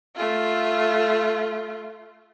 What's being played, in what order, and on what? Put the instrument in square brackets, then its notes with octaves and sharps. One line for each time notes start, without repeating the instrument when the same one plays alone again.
[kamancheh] A3 F4